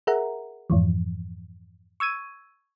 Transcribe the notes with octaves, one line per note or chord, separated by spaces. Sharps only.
G#4 A#4 E5 F#5 A#5
F2 G#2 E3 F3
C#6 E6 G#6 D#7